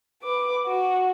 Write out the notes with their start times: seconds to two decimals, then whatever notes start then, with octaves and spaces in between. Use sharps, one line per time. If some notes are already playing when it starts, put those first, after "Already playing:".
0.23 B4 D6
0.67 F#4